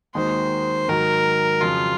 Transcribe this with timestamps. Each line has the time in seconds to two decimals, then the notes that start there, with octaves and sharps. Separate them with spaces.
0.15 D#2 D#3 G#3 D#4 F#4 C5
0.88 G#2 D#3 F#3 A#4
1.61 F2 C#3 F#3 F4